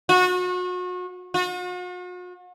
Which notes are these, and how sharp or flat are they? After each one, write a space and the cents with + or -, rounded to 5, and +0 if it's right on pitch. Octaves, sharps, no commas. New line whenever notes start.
F#4 -35
F#4 -45